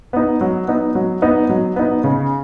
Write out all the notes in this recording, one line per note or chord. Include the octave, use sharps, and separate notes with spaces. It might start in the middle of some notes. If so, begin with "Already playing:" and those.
B3 D#4
F#3
B3 D#4
F#3
B3 D#4
F#3
B3 D#4
C#3